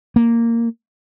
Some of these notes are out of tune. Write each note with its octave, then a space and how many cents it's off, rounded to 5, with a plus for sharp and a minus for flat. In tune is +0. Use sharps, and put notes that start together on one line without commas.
A#3 -10